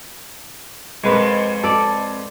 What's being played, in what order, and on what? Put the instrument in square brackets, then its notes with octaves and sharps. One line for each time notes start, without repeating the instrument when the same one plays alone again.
[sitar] F2 [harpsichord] G#3 B4 [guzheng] A#4 A#5
[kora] A4 D5